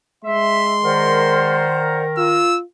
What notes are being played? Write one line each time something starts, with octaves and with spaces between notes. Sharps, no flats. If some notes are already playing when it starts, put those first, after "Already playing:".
G#3 E5 C6
D#3 A#4 C5 D5 F#5
F4 E6